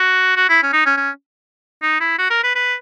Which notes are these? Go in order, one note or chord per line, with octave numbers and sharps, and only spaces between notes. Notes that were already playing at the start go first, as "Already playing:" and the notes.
Already playing: F#4
F#4
E4
C#4
D#4
C#4
C#4
D#4
E4
F#4
A#4
B4
B4